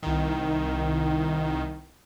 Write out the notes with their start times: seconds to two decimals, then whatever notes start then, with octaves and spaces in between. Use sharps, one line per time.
0.03 C2 D#3